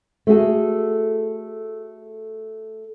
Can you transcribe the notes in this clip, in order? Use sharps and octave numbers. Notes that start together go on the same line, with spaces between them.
A3 F#4 G#4 A4